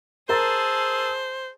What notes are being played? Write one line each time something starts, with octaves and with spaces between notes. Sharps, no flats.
G#4 A#4 C5 A5 A#5 E6 A6